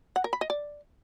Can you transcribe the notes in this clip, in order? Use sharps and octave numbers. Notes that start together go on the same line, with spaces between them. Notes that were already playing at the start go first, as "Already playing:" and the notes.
F#5
A#4
B5
D#5
D5